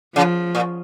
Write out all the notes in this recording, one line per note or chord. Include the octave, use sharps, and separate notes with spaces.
C#3 F3
A#2